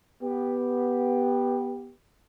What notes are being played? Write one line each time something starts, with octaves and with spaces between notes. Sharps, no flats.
B3 G4